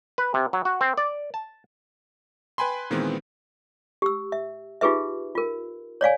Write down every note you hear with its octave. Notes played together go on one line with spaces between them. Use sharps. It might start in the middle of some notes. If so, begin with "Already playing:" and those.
B4
C3
F#3
F#4
C4
D5
A5
B4 G5 G#5 B5 C6
A#2 D#3 E3 G#3 B3 C4
G4 E6
E5
D#4 F4 G4 G#4 B4 E5
F4 A#4
C#5 D5 F5 G#5